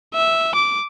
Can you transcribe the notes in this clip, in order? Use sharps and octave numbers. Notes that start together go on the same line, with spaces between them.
E5
D6